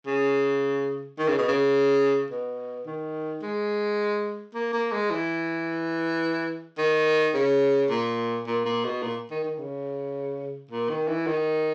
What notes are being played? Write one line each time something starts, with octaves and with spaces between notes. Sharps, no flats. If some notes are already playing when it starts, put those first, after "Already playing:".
C#3
D#3
C#3
B2
C#3
B2
D#3
G#3
A#3
A#3
G#3
E3
D#3
C#3
A#2
A#2
A#2
B2
A#2
D#3
D#3
C#3
A#2
D#3
E3
D#3